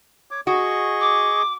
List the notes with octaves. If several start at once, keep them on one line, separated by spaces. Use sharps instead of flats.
C#5 D6
F#4 G#4 D#5 C#6
D6